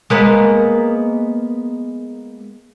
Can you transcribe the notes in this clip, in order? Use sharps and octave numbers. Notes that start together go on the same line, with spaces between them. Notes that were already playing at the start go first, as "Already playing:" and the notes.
G#3 A#3 B3